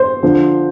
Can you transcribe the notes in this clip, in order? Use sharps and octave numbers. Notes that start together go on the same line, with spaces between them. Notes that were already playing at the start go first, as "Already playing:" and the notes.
Already playing: C5
D3 F3